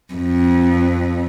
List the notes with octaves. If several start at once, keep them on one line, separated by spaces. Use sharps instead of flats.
F2